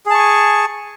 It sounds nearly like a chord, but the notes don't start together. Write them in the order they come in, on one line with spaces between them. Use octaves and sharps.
G#4 A5 C#6 G#5